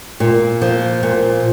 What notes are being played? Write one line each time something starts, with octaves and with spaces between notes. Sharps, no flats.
A#2
F3
A#2